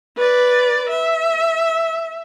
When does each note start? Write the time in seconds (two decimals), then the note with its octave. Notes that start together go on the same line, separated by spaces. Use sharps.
0.17 B4 D5
0.90 E5